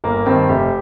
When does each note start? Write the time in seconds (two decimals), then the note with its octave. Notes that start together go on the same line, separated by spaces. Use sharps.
0.04 G1 A#3
0.26 G2 D#3 C4
0.49 F1 G4